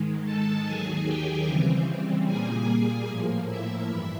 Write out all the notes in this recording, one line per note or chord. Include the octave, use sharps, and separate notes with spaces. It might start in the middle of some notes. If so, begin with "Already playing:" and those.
Already playing: G#2 D#3 G#3
A4 A5
D#2 D#3 F#3 G#4 G#5
G4 G5
C#3 E3 G3 C4
A#2 G3 A#3 G#4 G#5
A2 F3 A#3
E4 E5
G2 E3 E4 E5